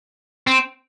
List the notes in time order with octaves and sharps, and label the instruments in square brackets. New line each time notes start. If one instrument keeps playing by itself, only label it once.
[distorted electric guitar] C4